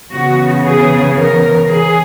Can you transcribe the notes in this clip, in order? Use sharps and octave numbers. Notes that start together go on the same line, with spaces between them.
C#3 E3 B3 F#4
G#4
A#4
G#4